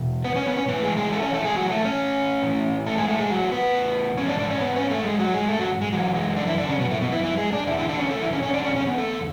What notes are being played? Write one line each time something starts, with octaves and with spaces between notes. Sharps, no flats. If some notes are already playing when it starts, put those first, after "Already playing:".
Already playing: E2 B2
B3 B4
C#4 C#5
B3 B4
C#4 C#5
A2 E3 B3 B4
G#3 G#4
G#3 G#4
A3 A4
C#4 C#5
A3 A4
G#3 G#4
F#3 F#4
A3 A4
C#4 C#5
A2 E3
A3 A4
G#3 G#4
A3 A4
G#3 G#4
F#3 F#4
B3 B4
G#2 E3 C#4 C#5
D4 D5
D4 D5
C#4 C#5
B3 B4
C#4 C#5
A3 A4
G#3 G#4
F#3 F#4
G#3 G#4
A3 A4
F#3 F#4
G#3
F#2 E3 F#3
G#3
D3 D4
E3 E4
D3 D4
C#3 C#4
B2 B3
A2 A3
B2 B3
E3 E4
E3 E4
G#3 G#4
D4 D5
E2 D3 E3 E4
E3 E4
D4 D5
C#4 C#5
A3 A4
E3 E4
C#4 C#5
C#4 C#5
D4 D5
C#4 C#5
C#4 C#5
B3 B4
A3 A4